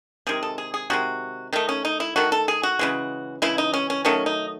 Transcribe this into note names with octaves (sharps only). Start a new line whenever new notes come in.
C3 D#3 G#3 G#4
A4
G#4
G#4
C3 D#3 G#3 F#4
D#3 A3 D#4
C#4
D#4
E4
D#3 A3 F#4
A4
G#4
F#4
C#3 E3 G#3
C#3 E3 G#3 E4
D#4
C#4
C#4
D#3 F#3 A3 C#4
D#4